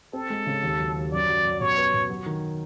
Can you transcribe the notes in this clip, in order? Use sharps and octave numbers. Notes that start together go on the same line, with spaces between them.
C4 A4
G#3
C#3
D#2
F#3
D#2
F#2 D5
F#3
F#2
B2 C#5
B3
B2
F#3
D#3